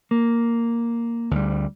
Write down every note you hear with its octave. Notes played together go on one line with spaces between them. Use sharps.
A#3
D2 G3